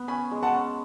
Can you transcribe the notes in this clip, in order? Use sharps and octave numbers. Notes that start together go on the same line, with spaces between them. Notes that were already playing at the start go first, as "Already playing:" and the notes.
Already playing: B3
C#4 G#5 B5
G#3
F#5 A5
C#4